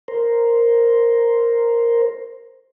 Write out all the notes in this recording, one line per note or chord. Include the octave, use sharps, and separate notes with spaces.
A#4 C5